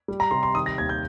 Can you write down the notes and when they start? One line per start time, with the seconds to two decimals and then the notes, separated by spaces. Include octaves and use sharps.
0.08 G3
0.20 A#5
0.31 C3 C6
0.43 C6
0.55 D#3 D#6
0.66 A#6
0.78 D#2 G#6
0.89 G6